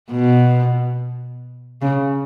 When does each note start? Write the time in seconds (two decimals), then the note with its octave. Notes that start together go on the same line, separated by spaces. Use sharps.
0.10 B2
1.82 C#3